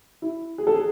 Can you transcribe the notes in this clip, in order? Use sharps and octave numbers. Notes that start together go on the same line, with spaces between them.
E4
G#4
A4
G#4